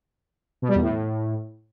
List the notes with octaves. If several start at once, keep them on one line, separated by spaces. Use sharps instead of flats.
B2
G3
E2
A2